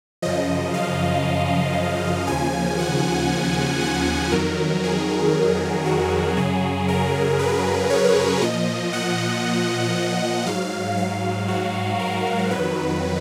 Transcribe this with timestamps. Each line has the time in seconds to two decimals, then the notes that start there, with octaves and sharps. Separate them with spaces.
0.22 F#2 C#3 F3 D#5
0.74 F5
2.27 D#2 C#3 F3 G#5
2.79 F#5
3.81 F#5
4.32 F2 D#3 F#3 A#4
4.84 G#4
5.86 F#4
6.37 F#2 C#3 F#3 G#4
6.88 A#4
7.39 B4
7.90 C#5
8.41 A#2 F3 D#5
8.93 F#5
10.46 G#2 F#3 F5
10.98 F5
11.48 F#4
11.99 A#4
12.51 F2 D#3 F#3 B4